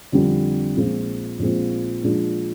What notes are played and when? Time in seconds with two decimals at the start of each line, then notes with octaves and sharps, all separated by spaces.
0.12 F2 D3 G3 D4
0.77 A#1 A#2 G#3 C4 F4
1.39 A#1 A#2 G#3 C4 F4
2.03 A#2 F3 G#3 D4